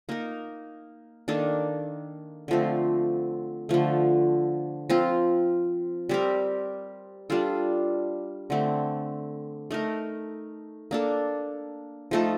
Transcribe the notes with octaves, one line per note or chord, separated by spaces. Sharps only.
A#3 D#4 A#4
D#3 A#3 D4 A4
D3 F3 A3 C4
D3 F3 A3
F3 C4 F4
G3 C4 G4 A#4
G3 D4 F4 A4
D3 A3 C4
A3 D#4 A#4
A#3 D4 A4
F3 A3 D#4 A4